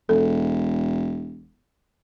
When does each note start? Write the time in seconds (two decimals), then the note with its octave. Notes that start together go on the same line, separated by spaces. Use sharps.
0.09 E1 A4